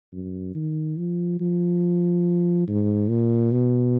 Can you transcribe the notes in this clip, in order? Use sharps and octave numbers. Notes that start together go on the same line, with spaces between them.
F#2
D#3
F3
F3
G#2
A#2
B2